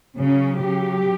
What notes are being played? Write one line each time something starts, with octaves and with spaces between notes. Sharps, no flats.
C#3 F#3 C#4
C#3 F#3 G4